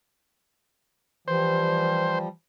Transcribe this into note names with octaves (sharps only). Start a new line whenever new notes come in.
E3 F3 G3 C5